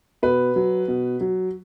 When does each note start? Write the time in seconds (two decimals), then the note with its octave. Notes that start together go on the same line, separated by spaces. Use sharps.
0.23 B2 B4
0.56 F#3
0.88 B2
1.21 F#3